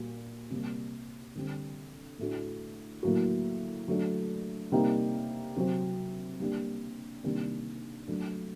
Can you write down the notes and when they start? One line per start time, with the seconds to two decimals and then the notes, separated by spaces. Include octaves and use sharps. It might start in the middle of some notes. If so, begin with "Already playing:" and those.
Already playing: A#2 G3 A#3 F#4
0.50 C3 G3 A#3
1.35 D3 G3 C4
2.19 A2 A3 D4 F#4
3.03 A2 F#3 A#3 F#4
3.88 F#3 A3 D4
4.72 C3 G3 A#3 D#4 G4
5.56 C3 F#3 C4
6.40 G3 A#3 D4 G4
7.24 C3 D#3 G3 A#3 D4
8.08 F#3 A3 D4